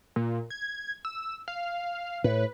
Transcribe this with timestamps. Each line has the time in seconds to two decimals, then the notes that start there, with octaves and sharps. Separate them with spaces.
0.16 A#2
0.50 G#6
1.05 E6
1.48 F5
2.24 A2 B4